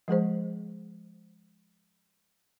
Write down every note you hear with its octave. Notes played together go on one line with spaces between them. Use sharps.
F3 G#3 G#4 C5